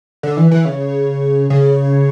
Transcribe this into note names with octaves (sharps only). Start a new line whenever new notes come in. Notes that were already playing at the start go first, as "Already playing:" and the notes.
D3
E3
E3
C#3
C#3